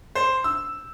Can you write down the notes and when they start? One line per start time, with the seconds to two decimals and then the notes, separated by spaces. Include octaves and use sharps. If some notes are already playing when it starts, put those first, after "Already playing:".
0.15 C5
0.44 E6